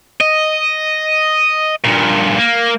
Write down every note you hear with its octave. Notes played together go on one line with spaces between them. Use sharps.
D#5
G2 A#2
A#3